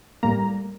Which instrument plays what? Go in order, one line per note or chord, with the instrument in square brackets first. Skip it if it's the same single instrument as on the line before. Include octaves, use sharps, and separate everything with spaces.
[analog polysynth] A2 G3 A#3 A#5